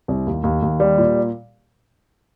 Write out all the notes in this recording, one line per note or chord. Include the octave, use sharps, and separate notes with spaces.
C2
D#2
D#2
D#2
G3
A#2